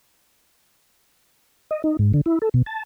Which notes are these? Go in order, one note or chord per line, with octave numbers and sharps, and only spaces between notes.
D#5
D#4
G#2
D3
E4
A4
B2
A5